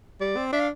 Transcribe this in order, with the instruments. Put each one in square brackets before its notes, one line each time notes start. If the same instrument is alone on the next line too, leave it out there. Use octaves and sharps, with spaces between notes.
[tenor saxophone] G3 [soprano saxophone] D5
[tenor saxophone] C4
[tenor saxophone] D4 [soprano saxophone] E5
[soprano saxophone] F5